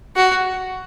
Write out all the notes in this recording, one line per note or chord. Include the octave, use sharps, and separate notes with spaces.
F#4